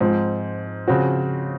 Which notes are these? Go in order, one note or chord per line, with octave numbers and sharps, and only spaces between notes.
G#2 F3 C4
C#3 F3 C4 F#4